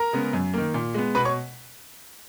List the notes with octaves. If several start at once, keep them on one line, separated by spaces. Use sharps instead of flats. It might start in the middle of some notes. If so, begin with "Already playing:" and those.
Already playing: A#4 A#5
C#3 G#3 B3
F#2
D#3 A#3
A#2
G#3 B3
B2 B4 B5
C#5 C#6